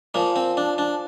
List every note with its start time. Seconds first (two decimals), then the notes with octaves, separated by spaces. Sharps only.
0.14 A#2 F3 A#3
0.36 C4
0.57 D4
0.78 D4